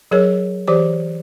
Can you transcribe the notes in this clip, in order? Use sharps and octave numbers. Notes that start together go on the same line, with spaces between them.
F#3 G#4 A#4 C#5
E3 G4 C5 D5 D6